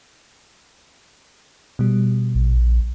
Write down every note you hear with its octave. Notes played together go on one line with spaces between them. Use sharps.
B2 G3
A#1